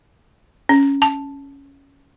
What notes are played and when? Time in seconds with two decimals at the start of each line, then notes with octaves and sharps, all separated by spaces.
0.69 C#4
1.02 A5